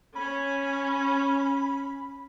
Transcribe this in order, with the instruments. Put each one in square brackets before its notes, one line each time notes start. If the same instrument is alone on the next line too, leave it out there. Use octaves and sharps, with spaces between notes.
[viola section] C#4 [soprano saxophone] B5